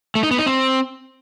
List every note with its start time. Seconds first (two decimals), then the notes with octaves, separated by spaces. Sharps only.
0.15 A3
0.23 D#4
0.31 B3
0.39 D#4
0.46 C4